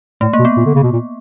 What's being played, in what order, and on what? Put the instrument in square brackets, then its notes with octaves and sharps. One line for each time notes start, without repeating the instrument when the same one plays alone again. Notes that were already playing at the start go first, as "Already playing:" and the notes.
[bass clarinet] A2 [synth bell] A3
[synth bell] A#3
[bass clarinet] B2
[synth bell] B3
[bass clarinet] A#2
D3
C#3
B2
A#2